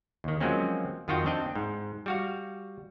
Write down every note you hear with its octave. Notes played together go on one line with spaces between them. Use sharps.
D#2 D#3
F3 F#3 G#3 A#3 C4 C#4
F2 D#3 F4 F#4 F5 G5
C4 D4 D#5 G5
G#2
G3 F#4 F5